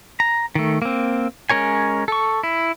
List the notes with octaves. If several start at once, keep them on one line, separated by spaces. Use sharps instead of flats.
A#5
D#3 A3
A#3 C4
G#3 C#4 A#4 C#5 G#5
A4 C#6
E4